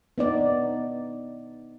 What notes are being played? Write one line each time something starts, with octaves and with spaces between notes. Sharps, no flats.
B3 D#4 D5